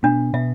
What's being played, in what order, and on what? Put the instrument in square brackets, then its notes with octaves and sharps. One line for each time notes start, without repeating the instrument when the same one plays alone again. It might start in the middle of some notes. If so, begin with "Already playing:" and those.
[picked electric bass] B2 B3 [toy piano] D4
[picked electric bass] B2 B3 [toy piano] E5